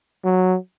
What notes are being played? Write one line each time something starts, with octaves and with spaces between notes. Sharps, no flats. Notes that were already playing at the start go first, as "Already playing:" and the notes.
F#3